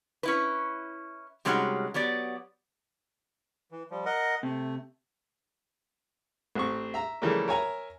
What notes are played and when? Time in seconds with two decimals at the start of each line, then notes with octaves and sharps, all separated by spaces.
0.23 C#4 E4 B4
1.45 C3 G3 G#3 C#4 D#4 F#4
1.94 F#3 B3 G4 D5
3.71 E3
3.91 F3 G3
4.06 A#4 D#5 F#5
4.43 C3 A3
6.55 A1 C4 C#6
6.94 E5 A#5
7.22 C#3 E3 F3 G3 A3 A#3
7.48 A#4 C#5 E5 G#5 A#5